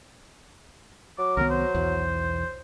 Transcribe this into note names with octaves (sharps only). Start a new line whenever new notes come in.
F#3 D6
C2 D#3 B3 A#4
C5
B1 E2